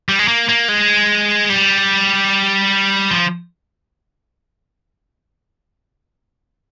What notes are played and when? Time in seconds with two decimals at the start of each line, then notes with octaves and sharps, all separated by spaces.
0.09 G3
0.19 G#3
0.28 A#3
0.49 A#3
0.69 G#3
1.50 G3
3.11 F3